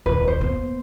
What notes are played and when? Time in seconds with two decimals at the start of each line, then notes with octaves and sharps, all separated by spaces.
0.06 D#1 C2 B4
0.28 C5
0.40 A#3 B3